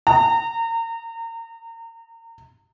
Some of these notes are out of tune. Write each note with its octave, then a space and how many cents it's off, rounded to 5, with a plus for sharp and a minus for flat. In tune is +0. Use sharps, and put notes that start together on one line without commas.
A#5 -30